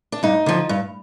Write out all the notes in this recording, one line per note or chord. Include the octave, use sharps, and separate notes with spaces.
D4
G2 D#4
D3 F3
G2